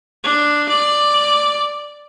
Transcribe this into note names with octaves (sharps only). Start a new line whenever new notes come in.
D4
D5